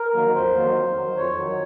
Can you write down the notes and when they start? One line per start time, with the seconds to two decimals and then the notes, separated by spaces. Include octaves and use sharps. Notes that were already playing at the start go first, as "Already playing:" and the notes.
Already playing: A#4
0.14 D#3 F#3 A#3
0.34 F2 C5
0.55 D#3 F#3 A#3
0.76 F2
0.96 D#3 F#3
1.16 F2 C#5
1.38 D#3 F#3